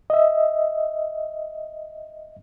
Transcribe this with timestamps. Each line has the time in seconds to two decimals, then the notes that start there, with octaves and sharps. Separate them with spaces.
0.10 D#5 E5